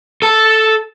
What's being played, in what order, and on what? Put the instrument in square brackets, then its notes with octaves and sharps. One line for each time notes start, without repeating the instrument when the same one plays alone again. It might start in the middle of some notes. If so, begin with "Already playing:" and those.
[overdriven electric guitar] A4 A5